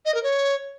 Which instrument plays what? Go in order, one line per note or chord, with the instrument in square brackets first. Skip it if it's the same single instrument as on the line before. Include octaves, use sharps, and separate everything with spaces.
[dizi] D#5
A#4
C#5